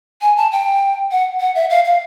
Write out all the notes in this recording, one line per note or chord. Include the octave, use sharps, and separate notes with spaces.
G#5
A5
G5
F#5
F#5
E5
F5
F5